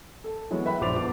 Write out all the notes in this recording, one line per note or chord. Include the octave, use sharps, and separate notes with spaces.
A4
E3 F#3 G#3 B3
B4 E5 G5 B5
A#1 C5 D6 A6 F7
F2 B3 D6